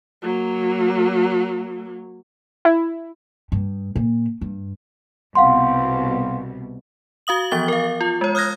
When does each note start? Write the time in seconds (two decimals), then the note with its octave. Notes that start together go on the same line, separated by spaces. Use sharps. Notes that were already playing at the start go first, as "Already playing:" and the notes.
0.22 F#3 A#3
2.65 E4
3.52 G2
3.96 A#2
4.41 G2
5.35 C2 B2 F5 F#5 C6
7.27 F#4 F5 D#6 F#7
7.51 E3 F3 B3 A6 G7
7.68 A#4 F5
8.01 F4
8.21 G#3 C#5
8.35 D#6 F6 F#6 G#6 A#6